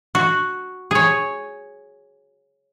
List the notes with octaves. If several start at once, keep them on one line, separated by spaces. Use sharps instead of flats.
F#4
G#4 C#5